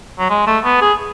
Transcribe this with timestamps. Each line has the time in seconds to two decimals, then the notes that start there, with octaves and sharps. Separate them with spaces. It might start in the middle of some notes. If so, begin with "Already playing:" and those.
0.19 F#3
0.30 G#3
0.47 A3
0.65 B3
0.81 G#4